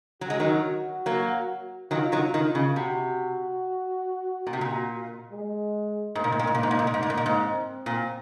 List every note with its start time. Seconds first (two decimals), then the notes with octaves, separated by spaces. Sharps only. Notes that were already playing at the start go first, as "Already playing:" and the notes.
0.21 F#3 F#4
0.30 G#3
0.40 D#3 F#3
1.06 F#3 A#3
1.91 D#3 F#3 F4
2.12 D#3 F#3
2.34 D#3 F4
2.55 C#3
2.76 C3 F#4
4.47 A#2
4.53 C3
4.61 A#2
5.31 G#3
6.15 G#2 A#3
6.24 A#2
6.32 G#2
6.39 A#2
6.47 G#2
6.55 A#2
6.63 G#2
6.71 A#2
6.79 G#2
6.87 A#2
6.94 G#2
7.01 A#2 A#3
7.10 G#2
7.17 A#2
7.26 G#2
7.43 C4
7.86 A#2